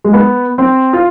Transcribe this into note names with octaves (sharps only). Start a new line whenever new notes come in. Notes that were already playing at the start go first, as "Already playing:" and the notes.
G#3
B3
C4
F4